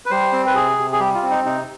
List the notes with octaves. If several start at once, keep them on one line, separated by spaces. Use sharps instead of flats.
B4
G3 C5
C4
B4
C3 G#4
C3
G#4
G3 G4
F4
C4
D#4
C3 D#4